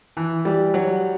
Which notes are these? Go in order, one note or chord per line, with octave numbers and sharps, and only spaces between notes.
E3
G3
F#3